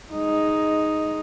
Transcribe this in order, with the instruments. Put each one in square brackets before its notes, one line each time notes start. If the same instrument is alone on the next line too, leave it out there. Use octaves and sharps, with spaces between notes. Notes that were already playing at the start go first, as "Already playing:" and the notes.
[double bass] G#3 D#4